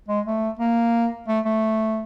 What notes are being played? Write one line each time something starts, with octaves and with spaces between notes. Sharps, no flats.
G#3
A3
A#3
A3
A3